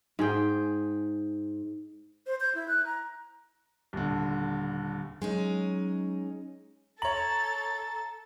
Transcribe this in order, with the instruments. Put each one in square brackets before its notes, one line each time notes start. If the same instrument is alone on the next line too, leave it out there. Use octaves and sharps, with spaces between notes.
[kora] G#2 G#4 G5
[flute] C5
G6
E4
F#6
A#5
[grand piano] D#1 D3
[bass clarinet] F#3 [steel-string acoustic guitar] G#3 C#4 D#4
[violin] A4 A6 [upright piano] C#5 F#7 [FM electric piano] A#5